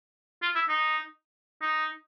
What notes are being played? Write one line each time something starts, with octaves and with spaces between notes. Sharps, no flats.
F4
E4
D#4
D#4